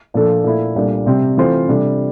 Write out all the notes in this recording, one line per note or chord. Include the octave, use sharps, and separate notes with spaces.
A#2 F3 A3 D4 A4
A#2 A3 E4
C2 A#2 A3 D4
C3 G3 C4
E3 A3 C4 F4 C5
C3 G3 D4 A4